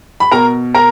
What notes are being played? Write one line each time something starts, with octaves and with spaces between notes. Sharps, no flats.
B5
B2 A#4 A#5
A#4 A#5